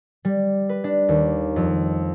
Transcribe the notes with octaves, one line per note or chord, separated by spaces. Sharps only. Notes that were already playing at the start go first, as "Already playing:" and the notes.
G3
B4
D4
D#2
F2